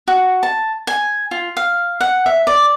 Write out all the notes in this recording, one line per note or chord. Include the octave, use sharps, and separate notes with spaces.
F#4
A5
G#5
F4
F5
F#5
E5
D5